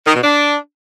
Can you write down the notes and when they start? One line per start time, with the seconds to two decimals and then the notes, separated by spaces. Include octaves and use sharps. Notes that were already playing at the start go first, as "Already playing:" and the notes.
0.07 D#3
0.15 B2
0.23 D4